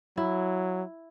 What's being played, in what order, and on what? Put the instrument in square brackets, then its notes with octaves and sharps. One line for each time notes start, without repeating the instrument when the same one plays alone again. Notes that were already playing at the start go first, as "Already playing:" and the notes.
[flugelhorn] F#3 [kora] E4